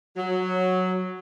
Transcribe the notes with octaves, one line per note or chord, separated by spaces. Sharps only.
F#3